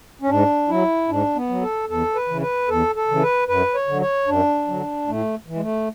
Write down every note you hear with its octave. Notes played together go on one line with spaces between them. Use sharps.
C#4
G#2 D4
F#3 E4
G#2 D4
B3
F#3
A4
E2 A4
B4
C#3 E3
B4
E2 A4
A4
C#3 E3
B4
F#2 B4
C#5
D3 F#3
C#5
F#2 D4
D3 F#3
A2 A3
E3
G#3
A3